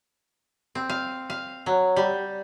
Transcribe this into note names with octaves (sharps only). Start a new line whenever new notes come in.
C4
F5
F5
F#3
G3